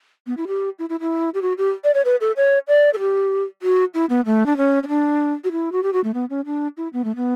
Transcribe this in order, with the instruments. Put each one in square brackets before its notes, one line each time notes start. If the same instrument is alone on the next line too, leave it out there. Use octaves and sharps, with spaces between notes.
[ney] B3
E4
G4
E4
E4
E4
G4
F#4
G4
D5
C#5
B4
A4
C#5
D5
A4
G4
F#4
E4
B3
A3
D4
C#4
C#4
D4
F#4
E4
F#4
G4
F#4
A3
B3
C#4
D4
E4
B3
A3
B3